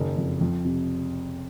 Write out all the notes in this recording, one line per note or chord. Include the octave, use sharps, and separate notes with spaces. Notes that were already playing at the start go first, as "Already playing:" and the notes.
Already playing: F#1 D#3
F2
F2
C3